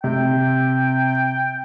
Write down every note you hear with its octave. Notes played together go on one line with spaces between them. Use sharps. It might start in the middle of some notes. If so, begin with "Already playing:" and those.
C3 G5